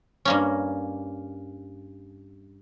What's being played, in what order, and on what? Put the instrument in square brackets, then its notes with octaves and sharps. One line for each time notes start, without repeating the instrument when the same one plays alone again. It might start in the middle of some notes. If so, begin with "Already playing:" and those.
[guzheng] G2 A#3 C#4